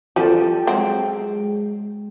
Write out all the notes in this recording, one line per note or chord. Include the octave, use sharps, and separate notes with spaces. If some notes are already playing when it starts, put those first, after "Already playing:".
F3 G3 A4 G5 G#5
F#3 G#3 C4